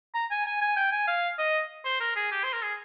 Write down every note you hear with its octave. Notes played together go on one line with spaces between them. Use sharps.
A#5
G#5
G#5
G#5
G5
G#5
F5
D#5
C5
A#4
G#4
G4
C5
A#4
G#4